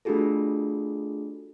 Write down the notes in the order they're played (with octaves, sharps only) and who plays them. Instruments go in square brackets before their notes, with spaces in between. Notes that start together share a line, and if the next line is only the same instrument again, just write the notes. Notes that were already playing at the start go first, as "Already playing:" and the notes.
[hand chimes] A3 D4 F4 F#4 G#4 A4